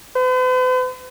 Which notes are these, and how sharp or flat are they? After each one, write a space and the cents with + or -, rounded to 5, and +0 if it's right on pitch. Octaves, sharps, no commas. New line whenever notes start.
B4 +45